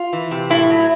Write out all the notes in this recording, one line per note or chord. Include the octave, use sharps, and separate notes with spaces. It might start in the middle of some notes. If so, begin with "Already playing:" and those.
Already playing: F4
E3
C3
A2 E4
F#3